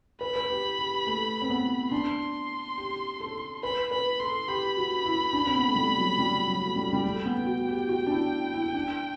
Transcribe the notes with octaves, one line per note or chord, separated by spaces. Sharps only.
B4 B5
B4
G4
G4
A3
C4
B3
D4 C6
G4
A4
B4 B5
B4 B5
A4 C6
G4 B5
F#4
E4
D4
C4
B3
A3
G3
F#3
G3
F#3
A3
G3
G3
A3 G5
B3
F#4
G4
F#4
D4
E4
E4
D4